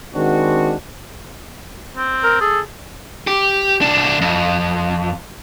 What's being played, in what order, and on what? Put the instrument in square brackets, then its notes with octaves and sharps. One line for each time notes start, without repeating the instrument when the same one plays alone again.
[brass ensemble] D#3 G#3 C4 D4 F#4
[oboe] C4
[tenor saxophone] A#4
[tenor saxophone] G#4 [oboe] A4
[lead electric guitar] G4
C2 D4
F2